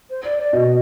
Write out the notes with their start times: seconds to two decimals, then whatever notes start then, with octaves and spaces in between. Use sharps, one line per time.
0.10 C5
0.24 D5
0.39 D5
0.53 B2 D#5